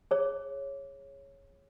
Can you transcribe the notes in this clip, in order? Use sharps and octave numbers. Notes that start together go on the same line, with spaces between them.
G#4 C#5